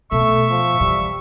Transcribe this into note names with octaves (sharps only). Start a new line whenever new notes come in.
B2 A3 E5 C#6
F3
E3 G3